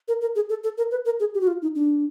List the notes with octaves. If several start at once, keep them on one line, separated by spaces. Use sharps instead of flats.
A#4
A#4
G#4
A4
A4
A#4
B4
A#4
G#4
G4
F#4
F4
D#4
D4